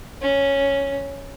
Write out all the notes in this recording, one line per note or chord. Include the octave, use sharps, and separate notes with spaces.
C#4